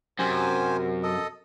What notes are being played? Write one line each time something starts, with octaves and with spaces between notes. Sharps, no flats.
F#2 C3 F#4 G4 A#4 C5 G#5
A4 D#5